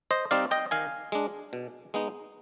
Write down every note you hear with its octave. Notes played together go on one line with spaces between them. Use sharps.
C5 D#5
G3 C4 D#4 D5 F5
D#5 G5
D#3 F5 G#5
G#3 D4
B2
G#3 B3 D#4